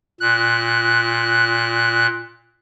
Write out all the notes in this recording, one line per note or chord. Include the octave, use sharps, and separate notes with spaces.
A#2 F#6